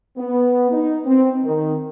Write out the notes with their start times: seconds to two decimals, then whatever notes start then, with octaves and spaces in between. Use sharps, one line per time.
0.18 B3
0.72 D#4
1.06 C4
1.45 D#3